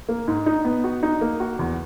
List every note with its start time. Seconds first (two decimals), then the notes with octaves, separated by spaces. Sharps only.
0.09 A#3
0.28 G#2
0.46 D#4
0.65 B3
0.84 F#4
1.03 D#4
1.21 A#3
1.40 F#4
1.59 E2